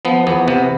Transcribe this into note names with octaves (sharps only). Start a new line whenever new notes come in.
F3 B3
E2 B3
C3 B3